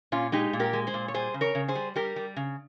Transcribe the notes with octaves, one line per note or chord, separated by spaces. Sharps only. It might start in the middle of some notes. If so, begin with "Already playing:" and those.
A#2 C#4 F4
G#3 D#4 G4
A#2
G4 A#4
G#3
G#4 C5
A#2
C#5
G3 G#4 C5
C#3
A#4 C#5
C#3
G#4 C5
G3
G3 G4 A#4
G3
C#3